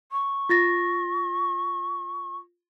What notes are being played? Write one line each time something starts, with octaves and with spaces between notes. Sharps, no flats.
C#6
F4 A6 A#6